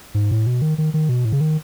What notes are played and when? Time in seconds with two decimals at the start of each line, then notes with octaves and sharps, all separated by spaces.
0.14 G#2
0.31 A2
0.47 B2
0.62 D#3
0.78 D#3
0.94 D#3
1.09 B2
1.25 A2
1.32 C#3
1.41 D#3